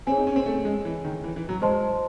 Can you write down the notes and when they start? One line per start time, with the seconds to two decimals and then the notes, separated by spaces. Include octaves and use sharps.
0.07 C4 G#4 C#5 G#5
0.17 D#4
0.27 C#4
0.36 C4
0.46 A3
0.65 G#3
0.85 E3
1.04 D#3
1.24 E3
1.36 E3
1.49 F#3
1.62 G#3 C5 D#5 A5 C6